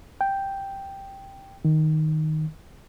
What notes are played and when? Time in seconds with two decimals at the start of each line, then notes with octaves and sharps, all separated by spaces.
0.21 G5
1.65 D#3